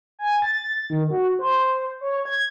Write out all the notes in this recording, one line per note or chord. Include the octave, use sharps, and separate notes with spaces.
G#5
A6
D#3
F#4
C5
C#5
G#6